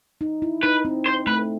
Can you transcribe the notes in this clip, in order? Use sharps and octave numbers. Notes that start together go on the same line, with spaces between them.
D#4
E4
D#4 B4
C4
C5
A3 B4